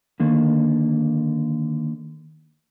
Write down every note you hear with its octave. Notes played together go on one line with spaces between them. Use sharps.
D3 D#3 A#3